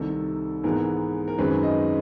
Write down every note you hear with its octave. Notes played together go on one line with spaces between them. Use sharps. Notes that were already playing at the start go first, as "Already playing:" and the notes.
Already playing: C2 C3 D#3 A4
G#2 E3 G#3 B3 A#4
A#4
F#2 D#3 G#3 C4 B4
D#5